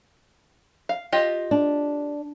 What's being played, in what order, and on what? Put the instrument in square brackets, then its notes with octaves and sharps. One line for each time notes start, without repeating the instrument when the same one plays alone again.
[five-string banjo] F5
F4 G4 D#5
[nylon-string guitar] D4